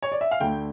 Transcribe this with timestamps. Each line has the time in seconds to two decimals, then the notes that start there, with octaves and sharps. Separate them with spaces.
0.02 C#5
0.12 D5
0.21 E5
0.31 F5
0.40 D2 D3 A3 G5